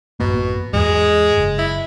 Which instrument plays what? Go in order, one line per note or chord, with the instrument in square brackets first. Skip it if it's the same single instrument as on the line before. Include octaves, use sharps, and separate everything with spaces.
[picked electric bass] A1 F#2 A#3 [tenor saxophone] B2
[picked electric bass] E2 G#2 [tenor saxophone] G#3
[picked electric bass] F#1
[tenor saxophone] E4